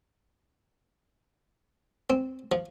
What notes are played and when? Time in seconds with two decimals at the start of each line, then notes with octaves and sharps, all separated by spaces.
2.10 C4
2.52 F3